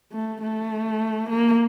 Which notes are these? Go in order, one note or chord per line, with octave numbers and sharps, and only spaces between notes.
A3
A3
A#3